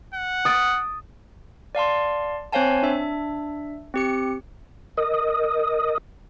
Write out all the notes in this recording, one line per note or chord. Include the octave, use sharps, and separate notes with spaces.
F#5
D#6 A6 D7
D5 F5 A5 C6
C4 C5 C#5 F5 G#5 A5
D4 E5
C4 G4 C#7
A#4 D#5 D#6